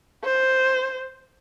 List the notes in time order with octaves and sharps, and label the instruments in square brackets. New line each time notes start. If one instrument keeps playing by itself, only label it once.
[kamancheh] C5